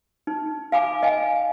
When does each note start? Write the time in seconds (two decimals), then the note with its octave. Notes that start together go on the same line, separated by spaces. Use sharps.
0.27 D#4
0.72 F5 G#5 B5 D6
1.03 D#5 F5 G5 G#5